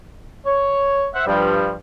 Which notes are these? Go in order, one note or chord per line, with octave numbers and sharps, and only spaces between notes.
C#5
C5 E5 F#5
G2 F3 G3